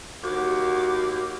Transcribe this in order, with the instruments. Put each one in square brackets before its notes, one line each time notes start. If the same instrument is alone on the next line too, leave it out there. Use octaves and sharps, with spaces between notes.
[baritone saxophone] D#2 [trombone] F#4 [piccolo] D6